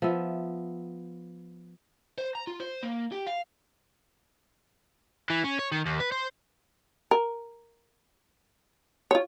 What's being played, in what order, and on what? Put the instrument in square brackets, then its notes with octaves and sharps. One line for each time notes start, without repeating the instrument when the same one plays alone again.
[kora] F3 B3 E5
[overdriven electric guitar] C5
A#5
F4
C5
A#3
G4
F5
E3
C#4
C#5
D#3
D#2
B4
C5
[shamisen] A#4
F4 C#5